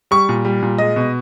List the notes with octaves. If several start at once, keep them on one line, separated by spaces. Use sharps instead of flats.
G3 C#6
A#2
G3
A#2
G#3 D#5
B2